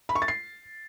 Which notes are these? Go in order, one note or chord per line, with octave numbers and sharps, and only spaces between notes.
B5
C#6
A6
C7